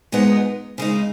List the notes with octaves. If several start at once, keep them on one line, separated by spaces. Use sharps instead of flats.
A#2 G#3 B3 D#4
C#3 G#3 D#4